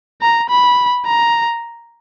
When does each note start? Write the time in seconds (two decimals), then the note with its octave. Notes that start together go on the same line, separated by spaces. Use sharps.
0.22 A#5
0.49 B5
1.05 A#5